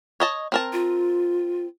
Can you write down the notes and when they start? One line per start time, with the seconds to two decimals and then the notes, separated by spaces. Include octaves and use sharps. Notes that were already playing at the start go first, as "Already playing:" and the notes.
0.20 C#5 D#5 A5
0.52 C4 A#4 A5
0.73 F4